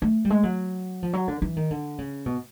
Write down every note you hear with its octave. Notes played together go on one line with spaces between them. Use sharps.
A3
G3
G#3
F#3
F3
F#3
D3
E3
D#3
D3
C#3
B2